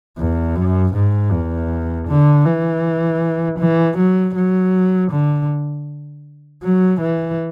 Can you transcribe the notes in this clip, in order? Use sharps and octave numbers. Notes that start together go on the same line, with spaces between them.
E2
F#2
G#2
E2
D3
E3
E3
F#3
F#3
D3
F#3
E3